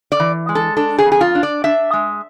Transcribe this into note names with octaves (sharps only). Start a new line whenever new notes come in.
D5
E3
G#3
A4
D4 A4
G#4
F2
G#4
F4
D4
D5
D4 E5
G#3